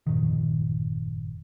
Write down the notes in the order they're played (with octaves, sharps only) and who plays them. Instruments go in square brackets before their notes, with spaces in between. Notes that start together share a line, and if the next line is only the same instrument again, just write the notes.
[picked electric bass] G1 F2 A#2 D#3